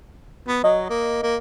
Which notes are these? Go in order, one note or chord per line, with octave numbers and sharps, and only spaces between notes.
B3
F#3 D#5
A#3
A#3